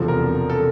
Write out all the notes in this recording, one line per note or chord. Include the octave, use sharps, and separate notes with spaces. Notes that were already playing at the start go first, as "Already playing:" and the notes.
Already playing: E1 E2 C3 F3 A4
A#4
A4